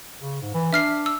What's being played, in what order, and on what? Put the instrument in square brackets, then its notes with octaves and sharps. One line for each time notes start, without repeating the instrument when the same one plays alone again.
[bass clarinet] C#3
G#2
E3
[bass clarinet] D4 [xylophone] E5 F6 C7
[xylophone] E6